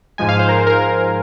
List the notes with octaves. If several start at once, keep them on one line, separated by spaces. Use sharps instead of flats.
G#2 F3 G#3 G#5
F5
C5
A#4
C5
A#4